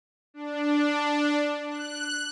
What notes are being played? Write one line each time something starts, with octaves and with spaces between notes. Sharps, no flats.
D4
F#6